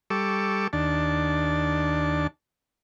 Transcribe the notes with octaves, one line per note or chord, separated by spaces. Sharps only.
G3 A4 C#6 D6 E6
D#2 D4 A5